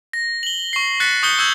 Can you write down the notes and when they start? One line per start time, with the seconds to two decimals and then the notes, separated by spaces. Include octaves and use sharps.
0.13 A#6
0.43 F#7 G7
0.73 C#6 C7
1.00 F#6 A6 B6 C#7
1.23 C#6 D#6 G6 C#7 G7
1.38 C#6 E6 G6 G#6 F#7